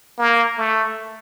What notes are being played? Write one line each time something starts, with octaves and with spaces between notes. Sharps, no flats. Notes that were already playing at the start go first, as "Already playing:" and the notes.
A#3
A3